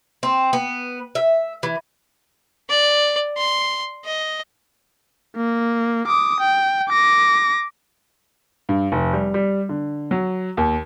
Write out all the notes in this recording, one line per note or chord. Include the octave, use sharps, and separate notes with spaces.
C4
B3
E5
E3
D5
C6
D#5
A#3
D6 D#6
G5
D6 A#6
G2
F1
G3
G3
D3
F#3
D#2